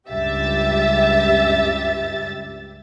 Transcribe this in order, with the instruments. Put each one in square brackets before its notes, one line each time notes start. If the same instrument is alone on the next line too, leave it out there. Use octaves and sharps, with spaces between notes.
[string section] C#2 G2 G4 E5 A6